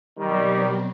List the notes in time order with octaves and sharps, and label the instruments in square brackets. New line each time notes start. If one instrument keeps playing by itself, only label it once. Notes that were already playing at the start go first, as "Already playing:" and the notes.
[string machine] B2 F#3 C4 [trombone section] D#3 G3